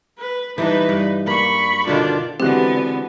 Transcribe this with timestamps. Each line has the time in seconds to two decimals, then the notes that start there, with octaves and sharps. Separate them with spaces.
0.18 B4
0.58 E3 G3 D4 D#4 B4
0.89 G2
1.27 A#3 B5 C#6
1.88 B2 D3 D#3 D4 F4
2.40 D3 E3 G#3 B3 C4 F#4 G4 F#6